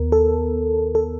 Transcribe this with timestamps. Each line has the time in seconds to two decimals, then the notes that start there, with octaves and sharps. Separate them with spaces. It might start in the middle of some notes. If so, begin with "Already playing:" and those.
Already playing: D#2 B3 A#4
0.12 A4
0.95 A4